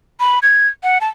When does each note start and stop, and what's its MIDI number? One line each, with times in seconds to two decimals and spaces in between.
0.20 0.39 83
0.43 0.68 92
0.83 0.98 78
1.01 1.08 81